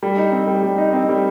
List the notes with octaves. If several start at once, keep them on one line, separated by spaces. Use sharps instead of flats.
G3
D#4
C4
G3
G3
D#4
C4
G3